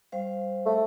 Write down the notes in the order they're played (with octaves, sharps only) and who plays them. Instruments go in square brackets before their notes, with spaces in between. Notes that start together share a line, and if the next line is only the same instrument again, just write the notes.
[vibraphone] G3 C5 F5
[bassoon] A3